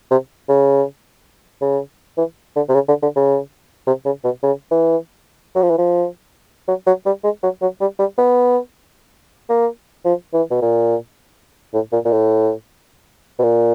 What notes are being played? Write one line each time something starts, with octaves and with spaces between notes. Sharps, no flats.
C3
C#3
C#3
E3
D3
C3
C#3
D3
D3
C#3
C3
C#3
B2
C#3
E3
F#3
F3
E3
F3
F#3
F#3
G3
G#3
F#3
F#3
G3
G3
B3
A#3
F3
E3
B2
A#2
A2
A#2
A#2
A2
B2
A#2